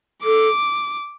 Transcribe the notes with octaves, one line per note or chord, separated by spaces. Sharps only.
A4 D6